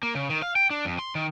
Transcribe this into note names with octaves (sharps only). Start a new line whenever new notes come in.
A#3
C#3
D#3
F5
G5
D4
F2
C6
D#3